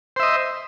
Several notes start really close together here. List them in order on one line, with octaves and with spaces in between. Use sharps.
C5 E5 D#5